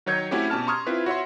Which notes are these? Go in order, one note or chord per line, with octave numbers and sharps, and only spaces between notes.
D#3 F#3 C#5 G6 G#6 C#7
A3 C4 C#4 E4 F#4 G4
B2 C#4 G4 A5 F6
A#5 C6 C#6 D#6 F6 G#6
C4 E4 F4 B4
F#4 C#5 E5 C6